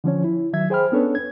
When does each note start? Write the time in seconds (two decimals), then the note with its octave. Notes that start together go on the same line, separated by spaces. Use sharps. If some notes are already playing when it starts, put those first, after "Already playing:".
0.04 D3 F3 C#4 C#5
0.24 E4
0.53 D#3 F#3 E5 G#6
0.70 G#4 C5 G5 B5 F6
0.92 B3 C#4 D4 A4 B4 C#5
1.15 G#6